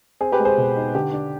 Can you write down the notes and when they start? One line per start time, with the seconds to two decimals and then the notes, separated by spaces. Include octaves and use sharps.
0.21 C4 G#4
0.32 G4 B4
0.39 G#3
0.45 G#4 C5
0.57 B2
0.76 D#4
0.94 D3 G4
1.13 D4